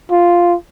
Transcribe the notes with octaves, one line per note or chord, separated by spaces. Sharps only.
F4